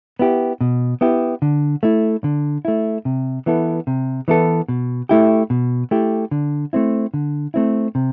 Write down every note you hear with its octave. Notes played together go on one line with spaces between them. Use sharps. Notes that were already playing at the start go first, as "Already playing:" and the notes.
B3 E4 G4
B2
B3 E4 G4
D3
A3 E4
D3
A3 E4
C3
E3 B3 E4 A4
C3
E3 B3 E4 A4
B2
A3 E4 G4
B2
A3 E4 G4
D3
A3 C4 E4
D3
A3 C4 E4
C3